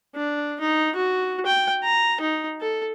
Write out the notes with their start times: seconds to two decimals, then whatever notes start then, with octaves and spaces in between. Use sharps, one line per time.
0.16 D4
0.61 D#4
0.96 F#4
1.46 G5
1.84 A#5
2.21 D#4
2.61 A4